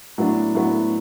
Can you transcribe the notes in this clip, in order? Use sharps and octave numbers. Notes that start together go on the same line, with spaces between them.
A2 F#3 B3 D4
A2 F#3 B3 D4